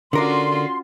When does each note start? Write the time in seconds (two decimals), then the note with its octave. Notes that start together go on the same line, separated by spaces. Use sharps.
0.13 D3 C#4 F4 F#4 A#4 D5 C6